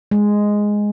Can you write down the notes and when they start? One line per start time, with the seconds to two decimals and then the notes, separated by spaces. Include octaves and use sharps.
0.11 G#3